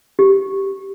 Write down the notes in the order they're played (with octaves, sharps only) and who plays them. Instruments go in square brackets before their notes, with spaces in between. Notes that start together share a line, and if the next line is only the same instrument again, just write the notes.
[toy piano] G4